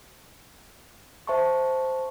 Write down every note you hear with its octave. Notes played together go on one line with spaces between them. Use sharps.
C5 E5 A5 C6 C#6